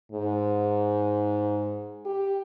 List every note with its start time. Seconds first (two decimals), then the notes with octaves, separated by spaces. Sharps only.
0.12 G#2
2.06 G4